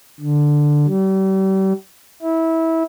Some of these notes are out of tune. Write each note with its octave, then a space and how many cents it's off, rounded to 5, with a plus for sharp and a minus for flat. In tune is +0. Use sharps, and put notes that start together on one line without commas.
D3 +5
G3 -40
E4 -20